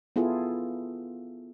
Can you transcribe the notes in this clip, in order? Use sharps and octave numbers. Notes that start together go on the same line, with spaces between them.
B3 E4 F4 G#4 A4